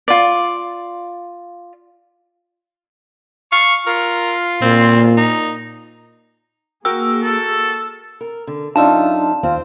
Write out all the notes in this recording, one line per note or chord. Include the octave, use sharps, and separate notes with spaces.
F4 D5
F5 C#6
F4 A#4
A#2 C4
D#4
A#3 F#4 G#4 A#4 G5 E6
A4
A#4
D3
F#2 D4 D#4 F4 D5 E5 A5
D#2 C4 F4